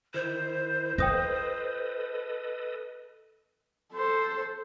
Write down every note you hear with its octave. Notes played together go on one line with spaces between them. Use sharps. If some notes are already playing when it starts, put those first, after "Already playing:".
D#3 E4 C5
F4 A4 B4 D#5 G5 D#6 A#6
A4 C5